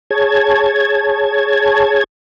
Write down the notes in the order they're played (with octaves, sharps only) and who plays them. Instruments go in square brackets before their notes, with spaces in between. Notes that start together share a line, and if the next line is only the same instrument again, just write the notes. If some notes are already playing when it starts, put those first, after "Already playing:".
[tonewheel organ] G#4 C#5 A5 G#6